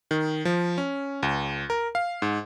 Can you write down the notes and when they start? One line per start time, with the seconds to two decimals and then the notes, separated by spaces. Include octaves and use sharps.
0.11 D#3
0.45 F3
0.78 C#4
1.23 C#2
1.70 A#4
1.95 F5
2.22 G#2